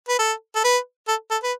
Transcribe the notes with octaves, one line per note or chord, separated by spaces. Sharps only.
B4
A4
A4
B4
A4
A4
B4